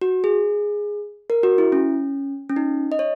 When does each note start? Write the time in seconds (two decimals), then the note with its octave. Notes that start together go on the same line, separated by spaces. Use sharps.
0.01 F#4
0.24 G#4
1.30 A#4
1.43 F#4
1.58 E4
1.72 C#4
2.49 C#4
2.56 D#4
2.92 D#5
2.99 C#5